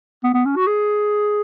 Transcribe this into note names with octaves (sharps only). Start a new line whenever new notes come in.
B3
B3
C#4
F#4
G#4